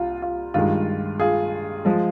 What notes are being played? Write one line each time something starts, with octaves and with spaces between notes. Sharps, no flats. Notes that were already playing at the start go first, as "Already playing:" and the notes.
Already playing: C2 G3 F4
F4
G2 D#3 G#3 F4
F4 G#4
F3 G#3